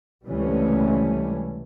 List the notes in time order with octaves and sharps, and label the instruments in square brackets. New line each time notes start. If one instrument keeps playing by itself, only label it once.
[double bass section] C#2 C3 E3 G3 A3 C#4